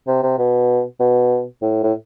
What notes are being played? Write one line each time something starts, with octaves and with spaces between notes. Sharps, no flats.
C3
C3
B2
B2
A2
A2